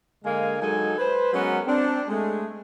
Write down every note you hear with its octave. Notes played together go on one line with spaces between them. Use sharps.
D3 G#3 A#3 D#5 F5 G#5
F#3 G#3 D#4 A4 G#5
B4 C5
F#3 G#3 B3 C#4 F#4 A#4
C4 D4
G#3 A3